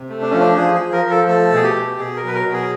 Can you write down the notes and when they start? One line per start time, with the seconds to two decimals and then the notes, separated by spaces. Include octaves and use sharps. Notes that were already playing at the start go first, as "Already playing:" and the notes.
Already playing: C3
0.09 A3
0.21 D4
0.30 F3 C#4
0.40 D4
0.57 F3 G#4
0.75 G#4
0.80 F3
0.92 A#4
1.05 F3
1.10 A4
1.28 A3 A4
1.52 B2 G#4
1.63 G4
1.75 B2
1.99 B2 G#4
2.16 A#4
2.23 F#3 B4
2.34 A#4
2.46 B2
2.53 G#4